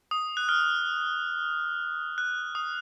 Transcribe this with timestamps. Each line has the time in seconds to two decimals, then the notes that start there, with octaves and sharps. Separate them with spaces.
0.11 D#6
0.37 F#6
0.49 F6
2.18 F#6
2.55 D#6